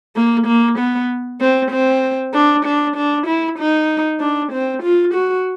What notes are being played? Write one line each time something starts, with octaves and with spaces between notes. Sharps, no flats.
A#3
A#3
B3
C4
C4
D4
D4
D4
E4
D#4
D4
C4
F4
F#4